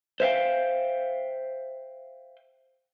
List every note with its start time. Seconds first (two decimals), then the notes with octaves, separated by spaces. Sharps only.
0.20 C5 E5 F5 G5